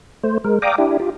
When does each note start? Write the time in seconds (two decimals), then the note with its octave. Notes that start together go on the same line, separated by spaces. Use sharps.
0.23 A3 C5
0.44 G#3 A#4
0.62 D5 F5 G5 A#5 D6 D#6
0.78 D4 E4 G4
1.00 F4 G4